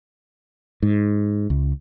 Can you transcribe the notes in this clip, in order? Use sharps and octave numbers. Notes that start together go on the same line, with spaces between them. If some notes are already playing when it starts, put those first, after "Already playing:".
G#2
C#2